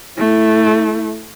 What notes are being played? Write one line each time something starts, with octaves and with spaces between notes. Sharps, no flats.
A3 E4